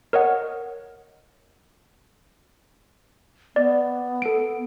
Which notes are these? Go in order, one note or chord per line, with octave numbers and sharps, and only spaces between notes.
A#4 C#5 D#5 F#5
B3 D5
A4 D7